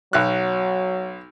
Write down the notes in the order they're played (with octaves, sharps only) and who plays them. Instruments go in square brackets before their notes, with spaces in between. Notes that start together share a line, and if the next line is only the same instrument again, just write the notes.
[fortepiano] B1 F#6 [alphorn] F#3